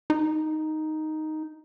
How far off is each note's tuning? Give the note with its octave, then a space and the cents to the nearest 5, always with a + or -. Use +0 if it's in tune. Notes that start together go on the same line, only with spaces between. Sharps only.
D#4 +0